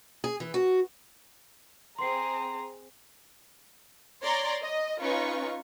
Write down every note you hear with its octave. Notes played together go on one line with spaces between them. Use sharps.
G#4
E3
F#4
C4 G#4 A#5 C6 C7
C#5 D5 A#5 C6
D#5
C#4 D#4 F4 B4 C#6